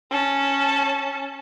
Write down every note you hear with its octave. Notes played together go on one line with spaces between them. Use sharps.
C#4 A5